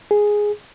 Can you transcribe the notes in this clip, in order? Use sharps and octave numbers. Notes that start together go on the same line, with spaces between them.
G#4